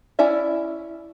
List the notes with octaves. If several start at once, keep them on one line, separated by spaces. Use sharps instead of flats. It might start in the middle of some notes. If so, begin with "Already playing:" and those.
C#4 E4 D5 E5